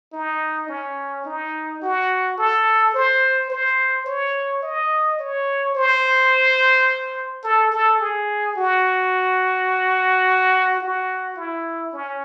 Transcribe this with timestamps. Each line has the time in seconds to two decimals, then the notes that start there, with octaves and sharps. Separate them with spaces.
0.13 D#4
0.69 C#4
1.25 D#4
1.82 F#4
2.38 A4
2.94 C5
3.50 C5
4.06 C#5
4.62 D#5
5.19 C#5
5.75 C5
7.44 A4
7.72 A4
8.00 G#4
8.56 F#4
10.80 F#4
11.37 E4
11.93 C#4